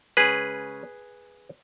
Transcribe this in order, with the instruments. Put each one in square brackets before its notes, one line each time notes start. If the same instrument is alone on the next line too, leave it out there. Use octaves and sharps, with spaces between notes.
[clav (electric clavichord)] C#3 G#3 C#4 G#4 B4